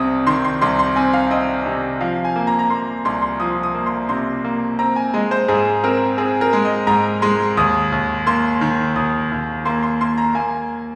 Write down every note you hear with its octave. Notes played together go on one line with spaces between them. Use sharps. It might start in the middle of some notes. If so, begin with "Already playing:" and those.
Already playing: C2 C3 C4 D#6
D#3 C6
C6
C2 C6
C6
C4 G#5
F5
C4 D#5
C3
F3 F5
G#5
A#3
A#5
A#5
A#3 C6
C2 C6
C6
F3 D#6
D#6
A#3
C6
C3 C6
A#3
C4 A#5
G#5
G#3 D#5
C5
G#2 G#4
C4 A#4
C4 G#4
A#4
G#3
D#5
G#2 A#5
G#3 C6
D#2 D#6
D#2
A#3 C6
D#3
D#2 D#6
D#2
A#3 C6
C6
A#3 C6
A#5
A#3 G#5